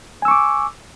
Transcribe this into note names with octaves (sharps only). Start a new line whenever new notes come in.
G#5 C#6 D6 E6